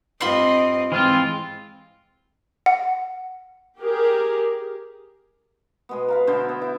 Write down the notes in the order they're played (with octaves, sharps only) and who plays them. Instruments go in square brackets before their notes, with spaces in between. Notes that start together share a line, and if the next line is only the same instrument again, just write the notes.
[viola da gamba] G2 C4 D#5 [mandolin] F4 B5 C6
[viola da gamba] G#2 [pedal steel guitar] E3 G#3 [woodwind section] C4 F4
[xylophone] F#5
[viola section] G4 G#4 A#4
[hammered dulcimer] B2 G#3 B3
B4 F5 A#5
B2 D3 E4 C5
B3
E4